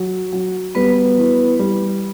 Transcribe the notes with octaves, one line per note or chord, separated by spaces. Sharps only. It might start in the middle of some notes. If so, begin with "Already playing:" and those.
Already playing: F#3
F#3
G3 B3 B4
E3
G3